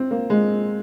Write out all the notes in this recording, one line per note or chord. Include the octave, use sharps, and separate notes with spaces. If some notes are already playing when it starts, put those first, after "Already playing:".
Already playing: C4
A#3
G#3